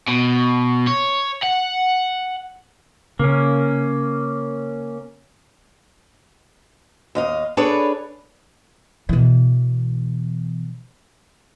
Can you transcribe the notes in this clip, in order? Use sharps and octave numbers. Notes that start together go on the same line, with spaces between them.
B2
C#5
F#5
C#3 A#3 C#4
D#2 D#5 F5
D4 G#4 A4 B4 C#5 D5
B2 E3